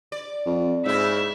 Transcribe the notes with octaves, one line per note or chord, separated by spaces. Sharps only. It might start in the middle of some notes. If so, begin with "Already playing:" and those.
D5
F2
G#2 C#3 E4 E5